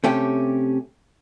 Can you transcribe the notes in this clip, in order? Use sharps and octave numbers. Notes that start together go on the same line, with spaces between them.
C3 A3 C#4 G4